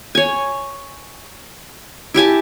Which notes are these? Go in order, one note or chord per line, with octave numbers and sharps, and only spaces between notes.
C#5 G#5
E4 G4 G#5 A5